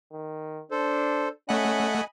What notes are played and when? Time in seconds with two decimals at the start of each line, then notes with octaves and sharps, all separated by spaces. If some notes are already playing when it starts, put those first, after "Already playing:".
0.12 D#3
0.71 D4 A4 C5
1.49 A3 C#4 D#5 F#5 G#5 B5